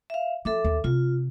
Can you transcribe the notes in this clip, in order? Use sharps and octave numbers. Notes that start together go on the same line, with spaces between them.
E5 F5
F3 A4 E5 D6
D#2
C3 F4